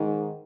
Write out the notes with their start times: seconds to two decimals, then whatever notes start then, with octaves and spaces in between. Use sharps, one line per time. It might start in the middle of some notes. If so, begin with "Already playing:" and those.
Already playing: G#2 D#3